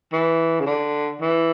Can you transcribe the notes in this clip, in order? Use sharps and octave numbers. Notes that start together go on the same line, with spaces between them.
E3
C#3
D3
E3